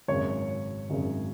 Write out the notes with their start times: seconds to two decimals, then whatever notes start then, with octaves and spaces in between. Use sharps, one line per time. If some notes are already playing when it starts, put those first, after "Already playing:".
0.08 G#1 F#2 C#3 C#5
0.90 G#1 F#2 C#3